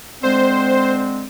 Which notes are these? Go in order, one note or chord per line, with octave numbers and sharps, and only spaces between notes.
D3 G#3 C4 C5